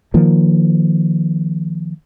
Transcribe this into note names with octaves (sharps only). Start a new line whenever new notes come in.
D#3 F3 A#3